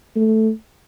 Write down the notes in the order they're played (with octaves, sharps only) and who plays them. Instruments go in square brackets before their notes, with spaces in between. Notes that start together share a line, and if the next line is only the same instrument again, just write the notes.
[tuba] A3